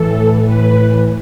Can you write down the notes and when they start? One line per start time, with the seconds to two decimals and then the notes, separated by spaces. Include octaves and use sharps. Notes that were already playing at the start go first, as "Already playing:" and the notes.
Already playing: A2 E3 A4
0.45 B4